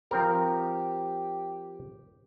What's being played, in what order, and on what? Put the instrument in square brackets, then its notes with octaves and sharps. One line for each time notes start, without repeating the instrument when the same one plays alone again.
[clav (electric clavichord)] F3 C4 A#4 [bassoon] G4